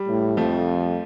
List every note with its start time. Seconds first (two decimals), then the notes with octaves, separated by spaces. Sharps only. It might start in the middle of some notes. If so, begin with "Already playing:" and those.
Already playing: G3
0.08 A2
0.37 F2 F3 A3